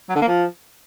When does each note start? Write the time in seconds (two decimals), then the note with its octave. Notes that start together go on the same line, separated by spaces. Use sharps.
0.09 F#3
0.15 D3
0.21 A#3
0.28 F3